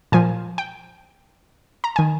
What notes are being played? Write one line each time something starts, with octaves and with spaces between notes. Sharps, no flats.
A#2 F3 G#5
G5
A#5
D#3 G#5